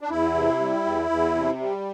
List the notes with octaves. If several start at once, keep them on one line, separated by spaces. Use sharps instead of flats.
D4
E2 E4
C3
G3
E2
E2
C3
G3